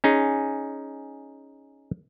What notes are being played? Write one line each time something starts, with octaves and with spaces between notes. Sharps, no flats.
C#4 D#4 G#4